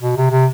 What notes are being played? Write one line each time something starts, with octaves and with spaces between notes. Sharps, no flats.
B2
C3
C3